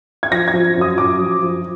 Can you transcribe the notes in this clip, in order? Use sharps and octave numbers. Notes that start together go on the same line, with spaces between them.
G#6
F3 A#6
G#6
F3
F#2
D#6
F#2 D6
F3
F3